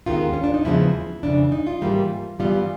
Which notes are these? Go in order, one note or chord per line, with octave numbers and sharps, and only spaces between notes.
D#2 D#3 G#3 B3 F4
C#4
D4
D#4
E2 C#3 F3 G#3 B3 E4
F2 C#3 E3 D4
D#4
F4
G#2 E3 G3 A#3
G2 E3 G3 B3 F4